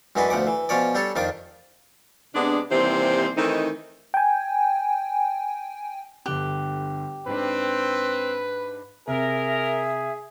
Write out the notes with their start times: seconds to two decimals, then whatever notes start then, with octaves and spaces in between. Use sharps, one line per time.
0.16 F#2 E3 G#3 D4 F#4 B4
0.30 D2 F3 F#5 D6
0.47 E3
0.69 B2 F3 C#4 C#5 D5
0.95 G3 D4 A4 C#5
1.16 F2 D#3 D4 F4 D6
2.35 C3 G#3 B3 D4
2.71 D#2 C3 E3 G3 C4 C5
3.37 D#3 E3 A3 C4 D#4
4.14 G5 G#5
6.26 G1 D3 G4 F#6
7.27 G#2 C4 D4 B4
9.08 C3 G#4 A#4 E5